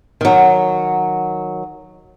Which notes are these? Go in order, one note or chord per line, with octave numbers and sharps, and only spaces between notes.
D#3 F#3